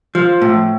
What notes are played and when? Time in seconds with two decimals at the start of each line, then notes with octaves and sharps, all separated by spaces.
0.15 F3
0.42 A2